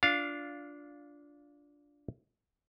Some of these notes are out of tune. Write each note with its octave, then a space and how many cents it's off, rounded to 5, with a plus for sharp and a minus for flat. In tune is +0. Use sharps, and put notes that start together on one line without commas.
D4 -15 F4 +5 F5 +0